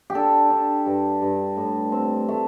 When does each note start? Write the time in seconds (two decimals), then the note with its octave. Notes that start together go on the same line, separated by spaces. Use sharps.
0.10 G4
0.15 D4 A4
0.50 D4
0.86 G2
1.22 G2
1.57 A2
1.92 C4
2.28 A3